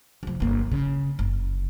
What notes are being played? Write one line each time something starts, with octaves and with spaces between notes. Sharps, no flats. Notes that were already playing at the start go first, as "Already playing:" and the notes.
F1 F3
G1 A#3
C#3
F#1